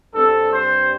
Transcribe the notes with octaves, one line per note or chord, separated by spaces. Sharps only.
G2 G3 C4 A4
C5